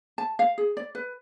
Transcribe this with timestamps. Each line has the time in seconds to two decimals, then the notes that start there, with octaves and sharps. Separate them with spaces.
0.18 A5
0.39 F5
0.58 G#4
0.77 D5
0.95 B4